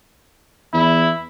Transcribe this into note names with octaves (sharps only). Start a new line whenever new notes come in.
E2 E4